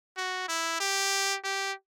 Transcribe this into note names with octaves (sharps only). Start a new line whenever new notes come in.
F#4
E4
G4
G4